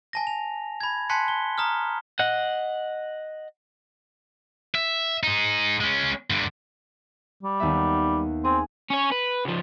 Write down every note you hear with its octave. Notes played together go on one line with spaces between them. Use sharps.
G#5 A5 A#6
F7
B5 G#6
G#5 A5 C6 F#6 B6 C#7
G7
A#5 D#6 F6
D#5 F#5
E5
D#4 G#4
G#3 C#4
G2 D3
G3
D#2 B3 E5
C4 G#4
C#4 C#5
B4
C#2 F3